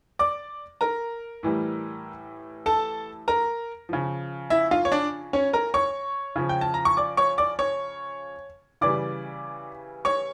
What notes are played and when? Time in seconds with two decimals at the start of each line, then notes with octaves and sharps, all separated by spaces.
0.19 D5 D6
0.81 A#4 A#5
1.43 A2 E3 G3
2.66 A4 A5
3.28 A#4 A#5
3.89 C#3 F3
4.50 E4 E5
4.71 F4 F5
4.85 C#5
4.92 D4 D5
5.33 C#4 C#5
5.53 A#4 A#5
5.74 C#5 C#6
6.36 C#3 F3
6.49 G5
6.61 A5
6.74 A#5
6.85 C#6
6.97 D5 D6
7.17 C#5 C#6
7.38 D5 D6
7.59 C#5 C#6
8.81 C#3 E3 G3 D5 D6
10.05 C#5 C#6